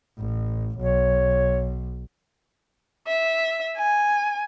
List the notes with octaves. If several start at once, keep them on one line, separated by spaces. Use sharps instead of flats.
A1
B1 C#5
E5
G#5